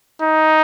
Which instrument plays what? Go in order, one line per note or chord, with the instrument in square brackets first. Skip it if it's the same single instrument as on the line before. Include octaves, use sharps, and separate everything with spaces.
[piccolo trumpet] D#4